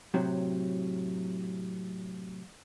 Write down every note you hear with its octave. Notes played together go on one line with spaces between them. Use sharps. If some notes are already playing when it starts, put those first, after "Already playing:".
A2 C3 F#3